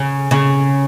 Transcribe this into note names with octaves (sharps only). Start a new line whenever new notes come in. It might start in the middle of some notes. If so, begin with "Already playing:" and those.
Already playing: C#3
C#3